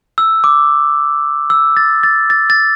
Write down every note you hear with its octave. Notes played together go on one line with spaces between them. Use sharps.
E6
D6
E6
A6
A6
A6
A6